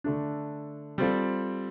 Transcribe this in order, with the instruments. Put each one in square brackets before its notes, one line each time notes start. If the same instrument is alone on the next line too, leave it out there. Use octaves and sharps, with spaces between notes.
[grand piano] D3 A3 D4
G3 C4 F4 A4